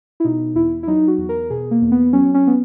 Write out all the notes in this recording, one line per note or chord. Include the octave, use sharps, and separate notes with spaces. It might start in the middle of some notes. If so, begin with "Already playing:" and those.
E4
B2 D#4
E2 E4
E4
F#3 D#4
F#4
E2
A#4
B2 G#4
A#3
E2
B3
F#3 C#4
C#4
B3